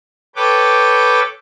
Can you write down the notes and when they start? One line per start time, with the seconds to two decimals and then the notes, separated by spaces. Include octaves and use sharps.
0.36 A4 B4 C#5 G5 D6